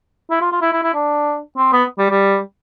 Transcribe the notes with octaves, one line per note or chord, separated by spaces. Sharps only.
E4
F4
F4
E4
E4
E4
D4
C4
B3
G3
G3